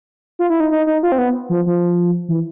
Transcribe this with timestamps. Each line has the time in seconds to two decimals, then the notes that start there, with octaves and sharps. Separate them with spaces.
0.39 F4
0.50 E4
0.60 D#4
0.71 D#4
0.87 D#4
1.03 F4
1.12 C4
1.18 B3
1.49 F3
1.66 F3
2.29 E3